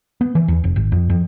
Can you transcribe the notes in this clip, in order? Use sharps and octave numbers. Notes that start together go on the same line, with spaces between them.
B3
E3
E2
F1
G#1
F2
F2